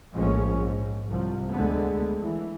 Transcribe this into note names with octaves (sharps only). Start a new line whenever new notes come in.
A#1 A2 F3 G#3 C#4
G#2
C2 F3
D2 D3 G#3 B3
E3